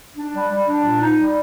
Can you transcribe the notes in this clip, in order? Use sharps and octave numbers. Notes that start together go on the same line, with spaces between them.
D4
G3
G3
D4
A#2
D#4
G3